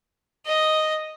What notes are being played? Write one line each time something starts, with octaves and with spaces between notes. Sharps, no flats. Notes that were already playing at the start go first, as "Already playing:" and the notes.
D#5